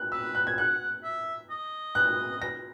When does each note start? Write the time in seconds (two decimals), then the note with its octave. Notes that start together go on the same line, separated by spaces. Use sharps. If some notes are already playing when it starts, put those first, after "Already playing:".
Already playing: F#6
0.12 B4 E6
0.35 F#6
0.47 G#6
0.58 F#5 F#6
1.04 E5
1.50 D#5
1.95 F#6
2.42 A#6